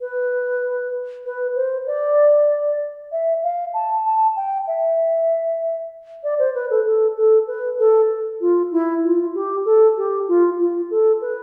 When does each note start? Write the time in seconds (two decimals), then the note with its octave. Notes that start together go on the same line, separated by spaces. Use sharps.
0.01 B4
1.26 B4
1.56 C5
1.87 D5
3.12 E5
3.43 F5
3.74 A5
4.06 A5
4.36 G5
4.68 E5
6.24 D5
6.39 C5
6.55 B4
6.70 A4
6.86 A4
7.17 A4
7.47 B4
7.79 A4
8.41 F4
8.72 E4
9.04 F4
9.35 G4
9.65 A4
9.97 G4
10.28 F4
10.60 F4
10.91 A4
11.21 B4